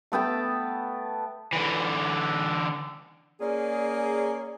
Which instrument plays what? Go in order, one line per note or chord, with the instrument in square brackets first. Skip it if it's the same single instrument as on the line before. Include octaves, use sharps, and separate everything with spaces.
[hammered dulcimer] A3 B3 G5 A5
[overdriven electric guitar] D3 E3
[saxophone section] A#3 C#4 G#4 [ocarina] D5